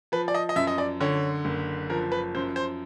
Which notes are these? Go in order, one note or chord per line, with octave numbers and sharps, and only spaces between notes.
F3 B4
D5
D#5
D#5
F#2 E5
D#5
D5
D3 C#5
F#1
F3 A#4
B4
F#2 C5
C5